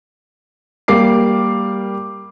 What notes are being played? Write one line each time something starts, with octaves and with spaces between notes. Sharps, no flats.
G3 A#3 D6 C7